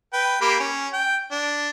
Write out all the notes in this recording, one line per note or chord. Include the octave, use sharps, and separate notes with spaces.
B4 G5
A#3 G4 B5
C#4
G5
D4